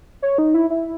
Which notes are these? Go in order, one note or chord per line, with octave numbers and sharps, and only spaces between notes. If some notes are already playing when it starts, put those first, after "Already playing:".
C#5
D#4
E4
E4